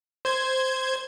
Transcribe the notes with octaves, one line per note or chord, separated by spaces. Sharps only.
C5 G#6